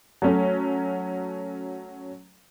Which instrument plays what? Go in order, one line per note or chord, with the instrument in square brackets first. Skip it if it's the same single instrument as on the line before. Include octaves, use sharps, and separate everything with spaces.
[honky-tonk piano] F#3 A3 C#4